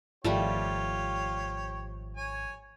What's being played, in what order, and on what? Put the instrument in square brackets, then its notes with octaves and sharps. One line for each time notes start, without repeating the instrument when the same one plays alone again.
[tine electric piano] G#1 [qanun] F3 G3 A3 [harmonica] F4 G4 C#5
[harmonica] C#5 G#5